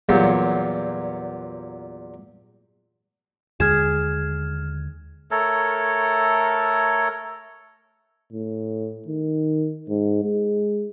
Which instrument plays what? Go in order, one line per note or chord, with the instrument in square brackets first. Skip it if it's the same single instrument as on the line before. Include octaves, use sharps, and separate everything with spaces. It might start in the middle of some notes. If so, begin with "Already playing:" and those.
[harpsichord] E2 A#2 F#3 G3
[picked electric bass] D#2 D3 G#3 [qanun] G#4 [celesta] F6 G#6 E7
[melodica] A3 A4 A#4 C#5
[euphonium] A2
D#3
G#2
G#3